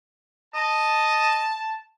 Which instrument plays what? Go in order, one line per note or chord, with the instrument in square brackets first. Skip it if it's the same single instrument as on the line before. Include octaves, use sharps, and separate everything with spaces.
[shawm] D#5 [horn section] A5